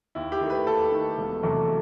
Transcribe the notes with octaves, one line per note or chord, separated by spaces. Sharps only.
D#2 E4
G4
D#3 A3
B4
D#2 A4
D#3 A3
E1
E2 C3 F#3 A3